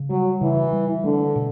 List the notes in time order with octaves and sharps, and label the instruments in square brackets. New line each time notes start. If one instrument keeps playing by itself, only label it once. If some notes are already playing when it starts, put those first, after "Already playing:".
Already playing: [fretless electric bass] C#3
[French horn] F#3 [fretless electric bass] G3
[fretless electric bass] C#3 [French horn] E3
[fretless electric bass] G3
[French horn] D3 [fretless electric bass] A3
[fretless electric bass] B2